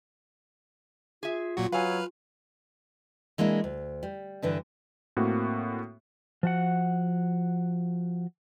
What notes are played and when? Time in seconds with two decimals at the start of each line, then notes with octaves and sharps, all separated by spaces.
1.23 F4 G#4 E5
1.57 A#2 F#3 F#4
1.72 F#3 B4 F5 G#5 F6
3.38 E3 G#3 A#3 D4 E4
3.64 D2
4.03 G3
4.42 G2 D3 E3
5.17 A2 A#3 C4 F#4
6.43 F3 F#4 F#5